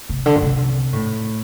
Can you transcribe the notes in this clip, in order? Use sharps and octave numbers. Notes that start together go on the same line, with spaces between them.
C3
D3
A#2
C3
A2